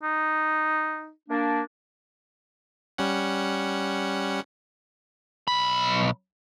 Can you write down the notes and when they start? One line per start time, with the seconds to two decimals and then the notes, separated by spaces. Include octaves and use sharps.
0.03 D#4
1.29 A#3 D4
2.98 G3 C#4 F#5
5.48 B1 B5